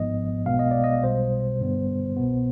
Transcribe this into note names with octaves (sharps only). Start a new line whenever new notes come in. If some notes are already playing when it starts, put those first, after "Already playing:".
Already playing: G#1 G#2 F3 B3 D#5
B1 B2 G#3 B3 F5
D#5
D5
D#5
B1 B2 G3 C5
G2 D3 G3 B3
C2 B2 B3